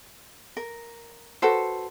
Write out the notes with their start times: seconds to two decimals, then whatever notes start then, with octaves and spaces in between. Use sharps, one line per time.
0.57 A#4
1.42 F#4 A4 B4 C5